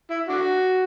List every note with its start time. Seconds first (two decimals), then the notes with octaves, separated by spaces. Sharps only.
0.10 E4
0.29 D4 F#4